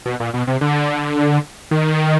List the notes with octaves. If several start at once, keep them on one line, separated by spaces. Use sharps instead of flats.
B2
A#2
B2
C3
D3
D#3